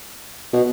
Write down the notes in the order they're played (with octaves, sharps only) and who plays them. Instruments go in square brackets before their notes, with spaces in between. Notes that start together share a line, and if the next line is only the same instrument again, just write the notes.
[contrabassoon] B2